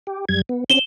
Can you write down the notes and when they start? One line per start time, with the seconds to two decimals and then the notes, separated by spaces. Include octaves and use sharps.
0.07 G4
0.29 F#2 G3 G#6
0.49 B3
0.70 C4 C#4 E7 G7